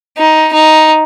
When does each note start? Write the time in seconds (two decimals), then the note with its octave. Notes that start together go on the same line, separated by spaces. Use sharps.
0.17 D#4
0.52 D#4